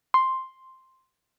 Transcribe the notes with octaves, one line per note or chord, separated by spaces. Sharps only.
C6